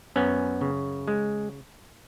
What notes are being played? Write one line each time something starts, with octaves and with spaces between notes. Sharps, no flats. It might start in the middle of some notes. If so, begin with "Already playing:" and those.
F#2 B3 C#4
C#3
G#3